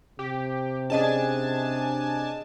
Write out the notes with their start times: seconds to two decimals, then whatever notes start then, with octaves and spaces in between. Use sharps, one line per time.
0.19 C3 G4
0.90 C#4 D4 G#4 D#5 G#5 A5